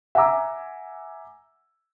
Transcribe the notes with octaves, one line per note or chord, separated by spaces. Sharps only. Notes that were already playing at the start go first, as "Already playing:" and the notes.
E5 F#5 G#5 A#5 D6 E6